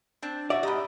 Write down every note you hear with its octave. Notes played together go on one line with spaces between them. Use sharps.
C4 D4
F#4 D5 E5
G#2 G4 D#5 A#5 B5